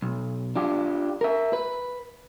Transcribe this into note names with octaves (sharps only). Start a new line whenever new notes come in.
B1
D4 F4 G4
A#4 E5
B4